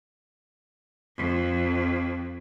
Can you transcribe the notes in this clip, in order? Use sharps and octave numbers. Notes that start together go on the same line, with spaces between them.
F2